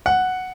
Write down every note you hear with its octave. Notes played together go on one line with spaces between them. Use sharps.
F#5